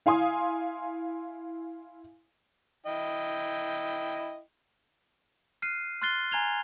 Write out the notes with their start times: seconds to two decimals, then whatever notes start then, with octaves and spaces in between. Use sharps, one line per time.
0.06 E4 F5 G#5 C6 D#6
2.86 E4 D#5 G5
5.62 F6 F#6 C7 D#7
6.02 C6 F6 F#6 A6 C7 G7
6.31 G#5 A#5 G#6 F7 G7